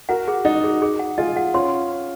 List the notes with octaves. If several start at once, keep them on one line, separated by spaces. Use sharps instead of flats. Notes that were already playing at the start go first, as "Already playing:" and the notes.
F#4 A#4 F#5
G#4
D#4 F#4 D#5
G#4
G#4
F#5
F4 G#4 D#5
F#5
C#4 F4 C6